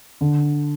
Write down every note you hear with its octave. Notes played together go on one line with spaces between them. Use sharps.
D3